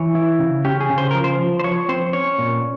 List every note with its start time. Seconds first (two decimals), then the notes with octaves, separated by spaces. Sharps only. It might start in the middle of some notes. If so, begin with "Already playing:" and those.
Already playing: E3 C#5
0.15 E4
0.39 C#3
0.65 C#4 G4
0.80 G#4
0.89 C#3
0.98 C5
1.11 F3 A#4
1.24 C5
1.39 F3
1.59 C5
1.64 F3 C#5
1.89 C4 C5
2.13 C#4 C#5
2.38 A#2